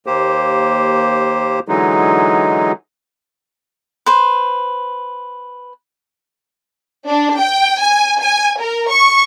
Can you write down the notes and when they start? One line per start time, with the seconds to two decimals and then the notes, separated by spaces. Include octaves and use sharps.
0.06 D#2 A#3 G4 C5
1.68 D3 E3 F#3 G#3 D#4
4.06 B4 C5
7.09 D4
7.40 G5
7.82 G#5
8.22 G#5
8.61 A#4
8.91 C#6